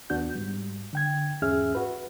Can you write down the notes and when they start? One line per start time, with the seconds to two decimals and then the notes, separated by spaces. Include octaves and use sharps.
0.10 D#2 B3 D4 F#4 G6
0.35 G#2 G3
0.93 D3 G5 G#6
1.42 E2 G#2 C#4 G#4 E5 F6
1.75 F#4 B4